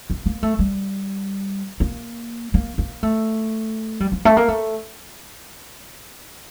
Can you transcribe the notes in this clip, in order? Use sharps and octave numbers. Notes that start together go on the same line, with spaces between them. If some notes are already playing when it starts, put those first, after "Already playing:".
A#3
A#3
A3
G3
A#3
A#3
A#3
A3
G3
F3
A3
A#3
A3